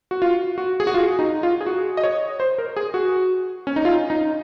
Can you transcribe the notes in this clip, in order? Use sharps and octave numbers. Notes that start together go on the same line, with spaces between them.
F#4
F4
F#4
G#4
F#4
F4
D#4
F4
G#4
F#4
D#5
C#5
C5
A#4
G#4
F#4
C#4
D#4
F4
D#4